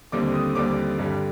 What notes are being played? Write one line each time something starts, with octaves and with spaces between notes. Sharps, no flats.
D#2 D3 G3 C4 D6
D#6
D#2 D3 G3 C4 D6
G2 D3 G3